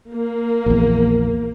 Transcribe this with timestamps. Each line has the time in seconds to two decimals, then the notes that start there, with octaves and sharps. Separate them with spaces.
0.10 A#3
0.66 A#1 E2